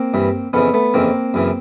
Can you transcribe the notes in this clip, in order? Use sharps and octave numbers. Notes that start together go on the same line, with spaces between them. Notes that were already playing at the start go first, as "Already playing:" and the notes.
Already playing: A#3 C4
G2 E3
F2 C#3 E3 B3 C#4
A3 B3
F2 C#3 E3 A#3 C4
F#2 C#3 E3